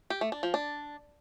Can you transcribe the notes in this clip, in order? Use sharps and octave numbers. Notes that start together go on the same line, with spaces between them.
G4
A3
D4
F3
D4